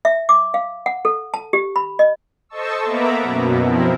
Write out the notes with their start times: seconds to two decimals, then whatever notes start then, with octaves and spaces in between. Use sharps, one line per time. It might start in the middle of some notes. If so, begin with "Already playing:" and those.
0.05 E5
0.29 D6
0.54 F5
0.86 F#5
1.05 A4
1.34 A5
1.53 G4
1.76 B5
1.99 D#5
2.49 A4 C5 D#5 A5 C#6 E6
2.84 A#3 B3 E5 A#5 B5 D6
3.21 F#2 B2
3.63 F3 C4 E4 A#4